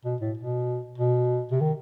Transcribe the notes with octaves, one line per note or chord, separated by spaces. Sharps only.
B2
A2
B2
B2
C3
D#3